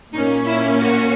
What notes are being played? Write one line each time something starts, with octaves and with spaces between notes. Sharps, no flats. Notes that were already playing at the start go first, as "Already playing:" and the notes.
A#2 A#3 C#4 D#4
E4
F#4